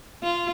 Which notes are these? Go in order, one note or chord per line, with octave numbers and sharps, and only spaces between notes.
F4